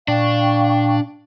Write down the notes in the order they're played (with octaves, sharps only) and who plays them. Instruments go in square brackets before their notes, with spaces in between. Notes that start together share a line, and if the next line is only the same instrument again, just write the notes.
[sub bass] A#2 [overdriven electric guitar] D4 [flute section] F5 G5 C#6